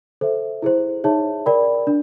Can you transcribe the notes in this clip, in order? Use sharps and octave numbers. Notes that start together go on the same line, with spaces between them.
A4 C5 E5
E4 G#4 C5
D#4 G#4 C#5 E5 A5
A#4 D5 G5 B5
D4